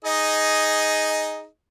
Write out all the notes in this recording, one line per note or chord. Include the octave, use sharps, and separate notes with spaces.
D#4 G#4 D#5